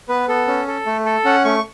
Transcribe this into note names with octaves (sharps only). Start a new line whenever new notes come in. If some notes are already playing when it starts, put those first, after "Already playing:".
B3 B4
B3 A4
C#4
A4
A3
A4
C#4 F#5
A3 C#6